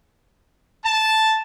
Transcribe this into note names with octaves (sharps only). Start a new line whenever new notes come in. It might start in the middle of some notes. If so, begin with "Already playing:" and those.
A5